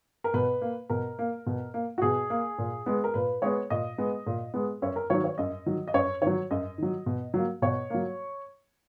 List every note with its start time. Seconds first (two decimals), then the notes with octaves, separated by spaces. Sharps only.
0.24 A#4
0.34 B2 B4
0.62 A#3
0.90 B2 A#4
1.19 A#3
1.46 B2
1.74 A#3
1.98 F#4
2.02 B2 G#4
2.30 A#3
2.58 A#2
2.86 G#3 B3
3.04 A#4
3.14 A#2 B4
3.42 G#3 B3 C#5
3.70 A#2 D#5
3.98 G#3 B3
4.26 A#2
4.54 G#3 B3
4.82 F#2 C#5
4.96 A#4
5.10 D#3 F#3 C#5
5.24 C#5
5.38 F#2 D#5
5.66 D#3 F#3
5.88 D#5
5.94 F#2 C#5
6.22 D#3 F#3 C#5
6.51 F#2 D#5
6.78 D#3 F#3
7.06 B2
7.34 F#3 A#3
7.62 B2 C#5
7.90 F#3 A#3